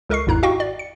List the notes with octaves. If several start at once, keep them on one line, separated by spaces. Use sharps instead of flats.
C#2 A4 A#4 D#5 C#6 C7
G#1 E2 G#2 E4 A#5 F#6
F#4 G4 D#5 F5 G5 C#6
D5
C#7